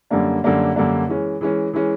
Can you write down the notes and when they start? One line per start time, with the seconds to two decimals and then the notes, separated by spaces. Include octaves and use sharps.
0.10 F#2 D3 G3 A#3 D4
0.44 F#2 D3 G3 A#3 D4
0.76 F#2 D3 G3 A#3 D4
1.08 E3 G#3 C#4
1.41 E3 G#3 C#4
1.73 E3 G#3 C#4